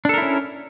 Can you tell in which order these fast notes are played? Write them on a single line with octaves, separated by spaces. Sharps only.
D4 A4 A#4 E4 C#4